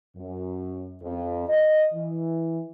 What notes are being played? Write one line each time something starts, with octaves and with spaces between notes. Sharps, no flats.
F#2
F2
D#5
E3